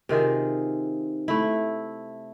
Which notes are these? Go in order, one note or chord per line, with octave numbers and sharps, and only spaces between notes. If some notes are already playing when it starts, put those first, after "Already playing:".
C3 D#3 F4 G#4
A3 E4